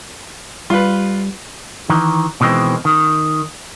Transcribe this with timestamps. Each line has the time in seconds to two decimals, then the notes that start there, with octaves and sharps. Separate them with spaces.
0.70 G3 F4 B4
1.90 D#3 E3
2.41 B2 D#3 E3 G#3 C4
2.85 D#3